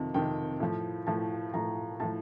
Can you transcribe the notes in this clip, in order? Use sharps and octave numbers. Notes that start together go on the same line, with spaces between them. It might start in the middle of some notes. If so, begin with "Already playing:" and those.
Already playing: F2 C3 D#3
F2 C3 D#3 G5
A2 F3
A2 F3 A5
A2 F3 A#5
A2 F3 A5